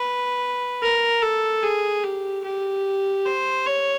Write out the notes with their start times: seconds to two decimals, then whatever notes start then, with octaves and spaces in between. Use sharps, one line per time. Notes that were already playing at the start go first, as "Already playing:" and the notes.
Already playing: B4
0.82 A#4
1.22 A4
1.64 G#4
2.03 G4
2.44 G4
3.26 C5
3.66 C#5